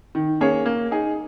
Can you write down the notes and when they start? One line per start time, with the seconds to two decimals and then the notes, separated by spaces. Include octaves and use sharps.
0.15 D#3
0.41 A#3 C#4 G#4 C#5
0.66 A#3
0.91 D#4 G#4